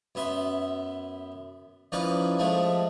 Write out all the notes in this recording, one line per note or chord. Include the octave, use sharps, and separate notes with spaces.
F#2 B3 E5 C6
E3 F3 C#4 D#4 B4 D5
F3 G#3 A3 C4